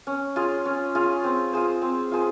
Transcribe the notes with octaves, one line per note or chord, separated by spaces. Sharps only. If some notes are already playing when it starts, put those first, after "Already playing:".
C#4
F4 G#4
C#4
F4 G#4
C4
F4 G#4 C5
C4
F4 G#4 C5